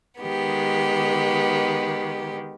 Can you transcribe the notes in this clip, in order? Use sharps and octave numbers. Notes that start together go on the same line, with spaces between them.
D#3 G#3 B3 G4